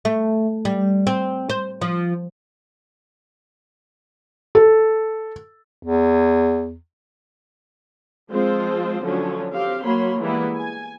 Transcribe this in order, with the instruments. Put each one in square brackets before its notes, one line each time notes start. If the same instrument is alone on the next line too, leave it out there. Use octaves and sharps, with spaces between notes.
[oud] A3
G3
C4
C5
F3
[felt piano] A4
[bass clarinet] E2
[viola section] F3 G#3 C4 F4 C5
D3 F3 F#3 A3 C#4
C4 G4 F5
F#3 A#3 C#5 B5 C6
E3 G3 G#3 A#3 B3 E4
G#5